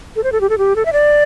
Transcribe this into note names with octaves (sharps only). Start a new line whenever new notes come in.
A4
C5
A4
G4
A4
G4
A4
E5
D5